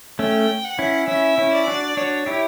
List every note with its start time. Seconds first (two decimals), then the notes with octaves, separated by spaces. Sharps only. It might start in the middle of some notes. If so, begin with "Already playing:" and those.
0.19 A3 C#4 G5
0.64 F#5
0.79 C#4 E4
1.08 C#4 E4 E5
1.38 C#4 E4
1.53 D5
1.68 D4 F#4
1.97 D4 F#4 C#5
2.26 E4 G4